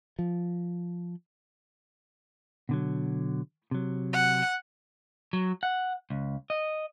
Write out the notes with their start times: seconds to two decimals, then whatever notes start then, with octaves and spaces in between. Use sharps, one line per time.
0.19 F3
2.69 B2 D3 F#3
3.71 C3 F#3
4.13 F#5
5.33 F#3
5.63 F#5
6.10 C#2
6.50 D#5